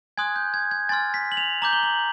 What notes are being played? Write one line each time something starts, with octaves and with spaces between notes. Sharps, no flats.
G#5 C6 D#6 F#6 G#6
G6
G#6
G#6
G#5 C6 F6 A6
B6
F#7
F7
A#5 D6 G6 F#7
G7
F#7